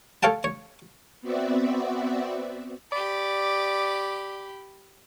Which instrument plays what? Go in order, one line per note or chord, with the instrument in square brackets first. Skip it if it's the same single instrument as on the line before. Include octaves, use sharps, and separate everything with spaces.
[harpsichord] A4 C#5 F5 G5 A5
C#5
[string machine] B3 C4 F#4 D5 E5
[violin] G4 B5 [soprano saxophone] D5